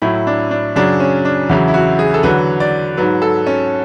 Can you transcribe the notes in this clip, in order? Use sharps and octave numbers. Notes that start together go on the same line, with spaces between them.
A2 F#3 E4
D4
D4
F#2 C#3 F#3 D4
C#4
D4
E2 C#3 F#3 E4
E4
F#4
G#4
A4
E2 D3 F#3 B4
D5
G#2 F#3 B4
A4
C#4